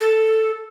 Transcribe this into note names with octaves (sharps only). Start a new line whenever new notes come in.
A4